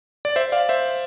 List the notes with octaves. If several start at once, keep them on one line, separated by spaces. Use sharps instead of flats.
D5
C5 E5
D5 F5
C5 E5